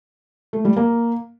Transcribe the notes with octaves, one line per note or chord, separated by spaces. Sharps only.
A3
G3
A#3